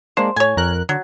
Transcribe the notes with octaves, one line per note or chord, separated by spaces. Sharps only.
G#3 A#3 D4 C5
A2 C#5 G#5
F2 A#4 F#6
D3 F#3